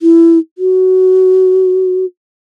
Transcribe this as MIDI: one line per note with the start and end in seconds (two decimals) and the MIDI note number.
0.02 0.39 64
0.58 2.05 66